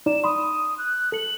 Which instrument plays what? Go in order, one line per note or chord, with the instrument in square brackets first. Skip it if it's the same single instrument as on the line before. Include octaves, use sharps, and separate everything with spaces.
[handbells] D#4 D5 [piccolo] E7
[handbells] B5 C6 [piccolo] D#6
[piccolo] F#6
[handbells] A4 C#7 [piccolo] F#7